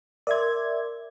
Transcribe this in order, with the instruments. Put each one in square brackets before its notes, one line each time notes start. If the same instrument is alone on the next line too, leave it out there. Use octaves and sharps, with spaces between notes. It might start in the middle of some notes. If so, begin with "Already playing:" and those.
[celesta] A#4 C6 [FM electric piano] D5 E5 G#6